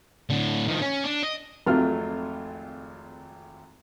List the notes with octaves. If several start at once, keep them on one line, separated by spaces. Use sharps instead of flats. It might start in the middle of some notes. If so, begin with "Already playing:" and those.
A2 D3
D#3 F3
C#4
D4
D#5
G#1 F2 F#3 A3 F4 F6